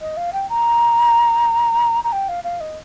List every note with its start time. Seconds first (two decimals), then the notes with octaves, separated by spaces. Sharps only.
0.01 D#5
0.17 F5
0.33 G5
0.49 A#5
2.04 A#5
2.12 G5
2.28 F5
2.44 F5
2.60 D#5